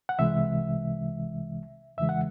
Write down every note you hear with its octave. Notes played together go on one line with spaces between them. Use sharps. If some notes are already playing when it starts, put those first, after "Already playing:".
F#5
C2 C3 E3 G#3 E5
E2 C#3 E3 G#3 E5
F#5